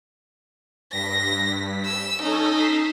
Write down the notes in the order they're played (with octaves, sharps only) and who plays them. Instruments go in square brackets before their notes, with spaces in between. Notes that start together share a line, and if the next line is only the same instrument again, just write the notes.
[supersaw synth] G2 B6 [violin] A#6
[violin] E6
[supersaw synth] C#4 A4 [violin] D#4
[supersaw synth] B6 C7 E7